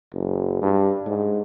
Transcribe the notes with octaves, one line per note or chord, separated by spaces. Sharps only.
F#1
G2
G#2